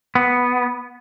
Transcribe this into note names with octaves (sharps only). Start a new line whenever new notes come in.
B3